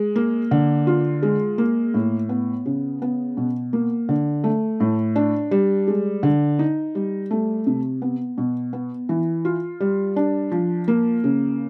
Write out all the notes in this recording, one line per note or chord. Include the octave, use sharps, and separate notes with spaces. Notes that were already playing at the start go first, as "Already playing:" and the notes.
Already playing: G#3
A#3
D3
F4
G#3
A#3
A2
B3
C#3
B3
B2
A#3
D3
A3
A2
D4
G3
G#3
D3
D#4
G3
A3
C3
B3
B2
B3
E3
F4
G3
D4
F3
A#3
C#3